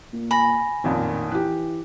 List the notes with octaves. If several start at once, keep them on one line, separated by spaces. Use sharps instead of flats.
A#2
G#5 B5 A#6
A1 F2 A#2 D#3
E3 G4 F#6